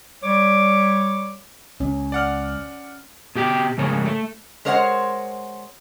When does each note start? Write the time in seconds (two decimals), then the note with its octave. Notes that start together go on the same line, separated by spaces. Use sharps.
0.23 G3 C#5 D6
1.80 C#2 C#4
2.12 D5 F#5 F6
3.35 B2 G4 G5
3.78 G#2 C#3 A#4 C#5
4.05 A3
4.65 G#3 A#4 C5 C#5 F5 F#5